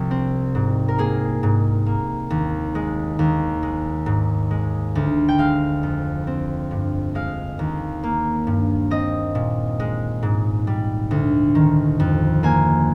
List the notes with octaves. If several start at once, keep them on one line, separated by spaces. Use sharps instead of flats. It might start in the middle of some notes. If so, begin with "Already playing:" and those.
Already playing: C2 F3 F4
C4
G#2
A#4
A#3 G#4
G#2
A#3
D#2
G#3
D#2
G#3
G#2
G#3
D2
G5
G#3 F5
F2
C4
G2
G#3 F5
D#2
A#3
G2
C4 D#5
A#2
G#3
G#2
G3
D2
D#3
F2
A#3 G#5